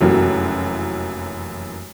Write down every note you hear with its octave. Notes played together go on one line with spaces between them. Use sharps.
F1 F#2 E3 A#3 F#4